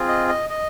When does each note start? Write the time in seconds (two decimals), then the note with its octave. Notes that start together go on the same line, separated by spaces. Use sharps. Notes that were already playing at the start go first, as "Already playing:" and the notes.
Already playing: C4 F4 G#4
0.08 D#5
0.28 D#5
0.50 D#5